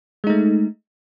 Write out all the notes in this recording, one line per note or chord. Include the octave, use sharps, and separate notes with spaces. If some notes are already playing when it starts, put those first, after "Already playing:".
G#3 A3 D#4